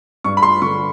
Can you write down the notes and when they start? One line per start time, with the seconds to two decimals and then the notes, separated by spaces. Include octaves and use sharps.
0.24 G2 C#6
0.37 B5
0.43 C6
0.62 D3 C#6